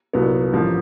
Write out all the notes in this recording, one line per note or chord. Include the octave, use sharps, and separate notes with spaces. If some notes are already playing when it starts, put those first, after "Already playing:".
C2 A#2 F#3 B3
A1 G2 D3 F3 A#3